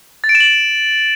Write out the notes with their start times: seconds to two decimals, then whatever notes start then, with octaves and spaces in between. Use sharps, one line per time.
0.24 A6
0.29 D7
0.35 E7
0.40 F#7